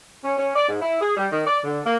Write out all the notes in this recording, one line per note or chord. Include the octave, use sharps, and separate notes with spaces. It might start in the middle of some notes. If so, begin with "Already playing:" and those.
C#4
C#4
D5
G#2
E4
G#4
G3
D#3
D5
D3
A#3